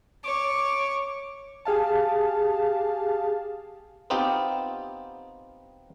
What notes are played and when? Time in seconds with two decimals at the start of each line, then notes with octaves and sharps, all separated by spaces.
0.24 C#5 D6
1.65 G4 G#4 F5 A5
4.10 B3 C4 D#4 F4 G4